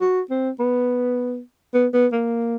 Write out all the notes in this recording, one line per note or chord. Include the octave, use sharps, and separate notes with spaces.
F#4
C4
B3
B3
B3
A#3